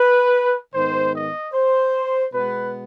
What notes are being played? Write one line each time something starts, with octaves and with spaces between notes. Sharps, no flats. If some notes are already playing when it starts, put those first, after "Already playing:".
Already playing: B4
G#2 D#3 B3 C5
D#5
C5
B2 G#3 B3 B4